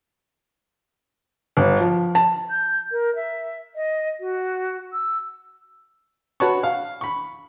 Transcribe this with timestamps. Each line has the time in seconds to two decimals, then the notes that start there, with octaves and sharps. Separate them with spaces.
1.57 G1
1.80 F3
2.15 A5
2.51 G6
2.92 A#4
3.15 E5
3.76 D#5
4.20 F#4
4.93 E6
6.40 F#4 B4 C#5 F#5 A5 C#6
6.63 F5
7.01 B5 C#6